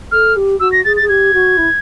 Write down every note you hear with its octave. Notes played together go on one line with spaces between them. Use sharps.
A4 F6
G4
F#4 E6
A#6
G#4 A6
A6
G#4
G4 G#6
F#4
E4